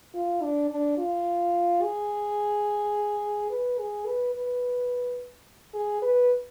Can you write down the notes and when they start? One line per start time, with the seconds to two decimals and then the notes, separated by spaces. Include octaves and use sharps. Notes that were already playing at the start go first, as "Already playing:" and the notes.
0.14 F4
0.42 D4
0.70 D4
0.97 F4
1.82 G#4
3.50 B4
3.79 G#4
4.06 B4
4.34 B4
5.74 G#4
6.02 B4